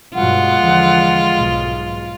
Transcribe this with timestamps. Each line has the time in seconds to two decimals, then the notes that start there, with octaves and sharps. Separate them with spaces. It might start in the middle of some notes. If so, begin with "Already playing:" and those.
0.15 G2 B2 F#3 G#3 F4 F#5
0.61 E2 D3 F3
1.33 B1 G#2